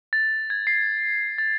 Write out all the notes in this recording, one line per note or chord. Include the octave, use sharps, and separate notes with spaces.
A6
G#6
C7
A6